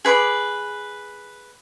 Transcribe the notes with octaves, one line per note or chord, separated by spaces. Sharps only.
G#4 B4 C#6 D6